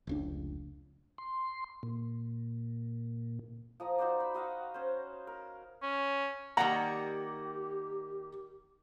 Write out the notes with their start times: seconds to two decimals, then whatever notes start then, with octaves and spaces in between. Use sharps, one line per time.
0.07 F1 C#2 D4
1.18 C6
1.83 A#2
3.80 F3 D#5 A#5
3.98 D#4 F#4 C5 D5
4.20 B5
4.34 F#4 D#5 F5 F#5
4.74 C#4 C5
5.27 A#4
5.82 C#4
6.57 D#3 G3 A#3 G4 F#5 A#5